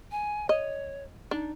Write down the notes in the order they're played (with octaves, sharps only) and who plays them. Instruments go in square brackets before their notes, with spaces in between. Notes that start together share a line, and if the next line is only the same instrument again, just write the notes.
[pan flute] G#5
[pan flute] C#5 [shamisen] D#5
[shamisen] D4 [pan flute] D#4